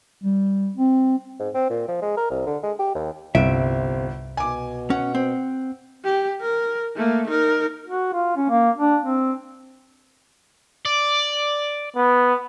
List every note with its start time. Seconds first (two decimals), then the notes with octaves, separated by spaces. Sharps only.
0.24 G3
0.77 C4
1.40 G#2
1.55 C4
1.70 A#2
1.88 F3
2.02 G#3
2.17 A#4
2.30 C2
2.46 D3
2.63 G#3
2.79 G4
2.95 D#2
3.35 G1 C2 C3 F4 E5 D7
4.37 B2 G#5 D6
4.90 C#4 F#5
5.15 C4
6.04 G4
6.41 A#4
6.97 A3 A#3
7.28 D#4 A#4
7.86 F#4
8.13 F4
8.36 C#4
8.50 A#3
8.78 D4
9.03 C4
10.85 D5
11.96 B3